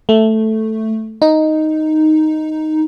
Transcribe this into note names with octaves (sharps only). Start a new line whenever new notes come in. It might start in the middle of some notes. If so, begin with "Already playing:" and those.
A3
D#4